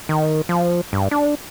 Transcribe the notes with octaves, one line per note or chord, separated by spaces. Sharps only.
D#3
F3
G2
D4